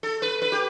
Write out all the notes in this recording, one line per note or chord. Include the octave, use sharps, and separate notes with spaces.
A4
B4
B4
G4